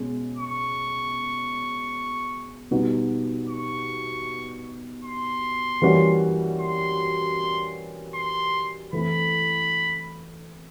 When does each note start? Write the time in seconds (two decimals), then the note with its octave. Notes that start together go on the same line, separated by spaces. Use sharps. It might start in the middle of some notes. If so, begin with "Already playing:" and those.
Already playing: B2 G#3 C#4
0.38 C#6
2.71 B2 G3 B3 D#4 F#4
3.49 C#6
5.04 C6
5.82 E3 G3 A#3 C#4 F#4
6.60 C6
8.15 C6
8.93 E3 A3 C4 E4 B5